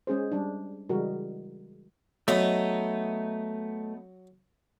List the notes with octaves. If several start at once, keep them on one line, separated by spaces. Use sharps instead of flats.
G#3 C#4 G#4 C5
G3 D4
C#3 E3 G3 G#3 F#4 A#4
F#3 A3 B3 D#4